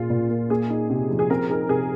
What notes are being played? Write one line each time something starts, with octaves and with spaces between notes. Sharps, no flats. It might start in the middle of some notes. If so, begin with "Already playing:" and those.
Already playing: A#2 F4 G#4
A#2
A#3
A#3 G#4
D#4
C3
F3
G#4
C4 A#4
D#4 G#4
C3 G#4